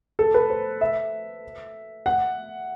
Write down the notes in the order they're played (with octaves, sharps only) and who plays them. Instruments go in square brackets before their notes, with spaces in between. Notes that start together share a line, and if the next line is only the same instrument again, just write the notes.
[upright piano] A4
B4
C5
E5
F#5